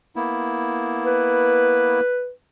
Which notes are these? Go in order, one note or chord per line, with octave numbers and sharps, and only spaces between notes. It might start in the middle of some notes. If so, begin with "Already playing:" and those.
A#3 B3 E4
B4